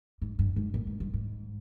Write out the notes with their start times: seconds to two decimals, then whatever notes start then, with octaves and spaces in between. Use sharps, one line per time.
0.22 G#2
0.39 G2
0.56 G#2
0.74 A#2
0.87 G#2
1.00 G2
1.14 G#2